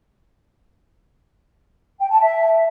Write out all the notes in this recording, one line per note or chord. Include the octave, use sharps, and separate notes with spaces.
G5
A5
E5